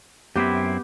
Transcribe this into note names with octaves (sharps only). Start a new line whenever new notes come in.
F#2 B3 C4 E4 G4